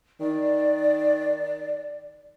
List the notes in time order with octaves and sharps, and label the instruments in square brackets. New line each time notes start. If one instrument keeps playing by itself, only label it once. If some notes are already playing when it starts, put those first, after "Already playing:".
[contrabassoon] D#3 [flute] D5